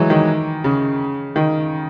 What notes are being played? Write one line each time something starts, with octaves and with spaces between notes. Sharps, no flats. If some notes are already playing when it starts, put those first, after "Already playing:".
Already playing: E3 F#3 G#3
D#3
C#3
D#3